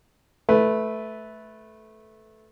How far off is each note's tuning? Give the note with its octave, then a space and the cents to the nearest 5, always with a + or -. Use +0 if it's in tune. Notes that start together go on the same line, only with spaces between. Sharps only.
A3 -10 B4 +0